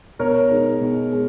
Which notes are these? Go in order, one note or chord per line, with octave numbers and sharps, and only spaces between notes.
B2 A#4 C#5
G#3 D#4
B2
G#3